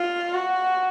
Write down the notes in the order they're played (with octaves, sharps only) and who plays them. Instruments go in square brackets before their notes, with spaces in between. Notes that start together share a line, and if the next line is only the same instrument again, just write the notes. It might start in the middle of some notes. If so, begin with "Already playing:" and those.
Already playing: [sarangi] F4
F#4